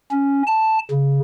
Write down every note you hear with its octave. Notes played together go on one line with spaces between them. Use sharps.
C#4
A5
C#3